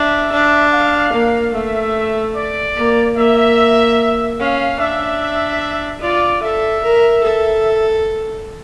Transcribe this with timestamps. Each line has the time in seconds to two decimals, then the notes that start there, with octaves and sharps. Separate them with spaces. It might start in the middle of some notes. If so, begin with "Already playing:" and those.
Already playing: D4 E5
0.32 D4
0.72 F5
1.12 A#3
1.53 A3 E5
2.35 D5
2.76 A#3
3.17 A#3 E5
4.39 C#4 F5
4.79 D4 E5
6.01 F4 D5
6.42 A4 E5
6.83 A#4
7.23 A4